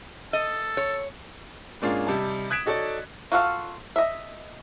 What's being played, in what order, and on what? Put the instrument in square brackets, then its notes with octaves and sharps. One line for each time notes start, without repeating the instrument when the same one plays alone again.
[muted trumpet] A4 [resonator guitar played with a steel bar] D#5
[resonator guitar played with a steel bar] C#5
[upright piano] G#2 A#3 C#4 D4 F4 G#4
C3 G3 D#4 A5
D#6 F#6 G#6 B6 D7 E7
D#4 F#4 A4 C#5 D5
[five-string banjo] F4 F#4 A4 F5
D#5 E5